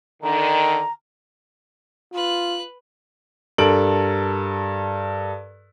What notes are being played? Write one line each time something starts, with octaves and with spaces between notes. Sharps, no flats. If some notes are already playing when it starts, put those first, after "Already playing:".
D3 D#3 A#5
F4 B4 F#6
G2 A4 A#4 D7 F#7